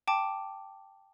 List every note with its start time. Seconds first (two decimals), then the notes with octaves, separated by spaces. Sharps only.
0.08 G5 A5 D6